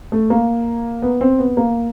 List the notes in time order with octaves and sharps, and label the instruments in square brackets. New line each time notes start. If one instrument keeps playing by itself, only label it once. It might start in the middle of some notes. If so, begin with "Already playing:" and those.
[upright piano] A3
A#3
B3
C4
B3
A#3